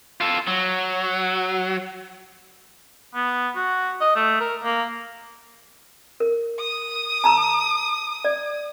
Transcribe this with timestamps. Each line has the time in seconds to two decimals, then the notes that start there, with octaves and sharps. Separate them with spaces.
0.21 F4 A4
0.47 F#3
3.15 B3
3.56 F#4
4.01 D#5
4.16 A3
4.41 A#4
4.64 A#3
6.20 A#4
6.59 D#6
7.24 A5 A#5 E6
8.25 D5